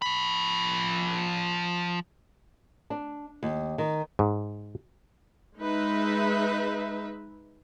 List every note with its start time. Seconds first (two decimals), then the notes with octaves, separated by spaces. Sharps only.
0.02 F3 B5
2.90 D4
3.43 D#2
3.78 D#3
4.19 G#2
5.58 G#3 D#4 B4 E5